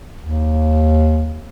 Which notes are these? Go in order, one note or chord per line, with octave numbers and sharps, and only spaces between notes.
D#2